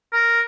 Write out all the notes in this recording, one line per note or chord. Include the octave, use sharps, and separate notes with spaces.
A#4